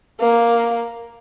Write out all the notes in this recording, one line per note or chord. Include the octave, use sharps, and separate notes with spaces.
A#3